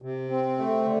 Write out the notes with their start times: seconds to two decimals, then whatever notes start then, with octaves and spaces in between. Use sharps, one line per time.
0.02 C3
0.29 C4
0.58 A3
0.84 D3